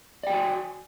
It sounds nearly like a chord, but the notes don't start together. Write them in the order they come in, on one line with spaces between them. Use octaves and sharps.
D5 G5 F#4 G#5